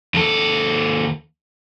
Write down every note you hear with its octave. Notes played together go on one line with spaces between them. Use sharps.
D#2 A4